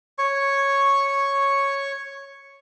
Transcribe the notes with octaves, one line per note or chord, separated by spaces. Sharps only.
C#5 C#6